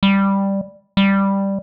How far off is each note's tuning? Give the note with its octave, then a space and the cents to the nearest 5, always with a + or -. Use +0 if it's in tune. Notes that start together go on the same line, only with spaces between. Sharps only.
G3 +5
G3 +5